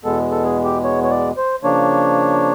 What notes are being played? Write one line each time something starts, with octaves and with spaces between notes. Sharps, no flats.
E2 B2 G#3 B3 A4
A4
G#4
G4
C#5
C#5
D5
C5
C#3 F3 A#3 D4 C#5